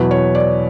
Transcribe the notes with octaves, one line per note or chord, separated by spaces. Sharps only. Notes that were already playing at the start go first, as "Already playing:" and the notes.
Already playing: E2 B2 F#3 B4
C#5
D5